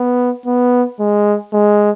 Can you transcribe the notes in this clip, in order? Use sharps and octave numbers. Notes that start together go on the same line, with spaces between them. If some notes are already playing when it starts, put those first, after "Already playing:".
Already playing: B3
B3
G#3
G#3